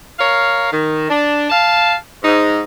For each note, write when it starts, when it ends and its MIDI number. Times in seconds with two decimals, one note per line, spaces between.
0.19 0.68 70
0.19 0.68 73
0.19 0.68 77
0.72 1.08 51
1.10 1.47 62
1.50 1.95 77
1.50 1.95 81
2.23 2.61 44
2.23 2.61 63